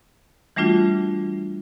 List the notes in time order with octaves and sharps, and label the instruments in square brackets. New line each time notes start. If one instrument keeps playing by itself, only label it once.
[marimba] E3 G3 A3 D4 F4 F#4